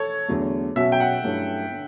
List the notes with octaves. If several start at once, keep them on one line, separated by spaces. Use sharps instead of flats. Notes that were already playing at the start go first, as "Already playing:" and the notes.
Already playing: A4 C#5
E2 D3 F#3 A3
B2 F#3 C#4 F#4 E5
G5
F#5
G2 F#3 A3 C#4 E4
D3